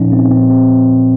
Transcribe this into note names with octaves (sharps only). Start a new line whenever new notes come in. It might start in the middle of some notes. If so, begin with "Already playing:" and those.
Already playing: A#2 F3 C#4 D#4
C4
A#2 F3 C4
C4
C4